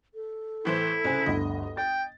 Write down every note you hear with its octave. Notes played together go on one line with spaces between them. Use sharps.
A4
A2 E3 E4 C5
C2 C#3 C5 G#5
G1 D2 D#5 B5
G5 A6